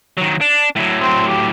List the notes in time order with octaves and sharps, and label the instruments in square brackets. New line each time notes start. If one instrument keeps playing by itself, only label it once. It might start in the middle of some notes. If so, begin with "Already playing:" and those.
[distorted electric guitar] D#3 F#3
D4
A2 F#3
[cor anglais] C4
G4